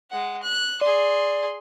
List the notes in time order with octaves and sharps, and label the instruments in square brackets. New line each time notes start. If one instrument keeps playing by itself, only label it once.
[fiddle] G#3 F#5
F#6
[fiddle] G#4 C6 [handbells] D5